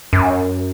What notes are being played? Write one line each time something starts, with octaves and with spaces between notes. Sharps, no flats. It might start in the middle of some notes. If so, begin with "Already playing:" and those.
F#2